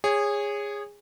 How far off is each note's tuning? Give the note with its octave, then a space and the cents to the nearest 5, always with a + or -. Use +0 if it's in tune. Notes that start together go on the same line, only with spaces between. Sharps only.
G#4 -20 C#5 +0